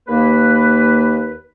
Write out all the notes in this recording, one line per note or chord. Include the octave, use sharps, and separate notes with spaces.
D#2 A#3 B4